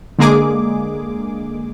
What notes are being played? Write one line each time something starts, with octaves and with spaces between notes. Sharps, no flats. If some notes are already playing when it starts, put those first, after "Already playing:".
D3 G#3 A#3 G#4 D6